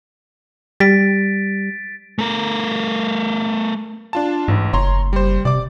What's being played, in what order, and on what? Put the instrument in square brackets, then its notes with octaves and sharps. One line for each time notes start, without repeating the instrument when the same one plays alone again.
[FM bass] G3 [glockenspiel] A6 B6 D7
[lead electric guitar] A3 A#4
[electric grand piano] D4 F4 A5
[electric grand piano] A1 [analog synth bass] G#2
[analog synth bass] F#1 [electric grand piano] C#5 A#5 C6
[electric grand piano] G3 C5
[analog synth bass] C3 [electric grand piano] D5 D6